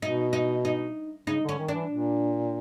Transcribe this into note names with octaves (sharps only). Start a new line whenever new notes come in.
B2 D#4
D#4
D#4
C#3 D#4
D3
C#4
D#3
D4
E3
A#2